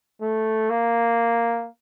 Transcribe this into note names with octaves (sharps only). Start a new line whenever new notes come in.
A3
A#3